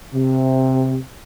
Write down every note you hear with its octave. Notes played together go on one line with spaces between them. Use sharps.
C3